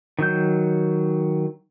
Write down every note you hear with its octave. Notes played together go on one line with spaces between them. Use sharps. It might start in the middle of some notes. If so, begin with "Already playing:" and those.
D#3 F#3 G6